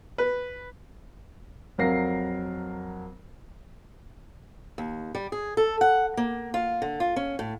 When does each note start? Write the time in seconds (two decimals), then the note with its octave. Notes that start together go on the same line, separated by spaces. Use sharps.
0.18 B4
1.78 F2 F#3 A#4 F5 A#6 C7
4.78 D#2
5.15 G3
5.32 G#4
5.57 A4
5.81 F#5
6.17 A#3
6.54 F4
6.82 D3
7.00 F4
7.16 C#4
7.39 A2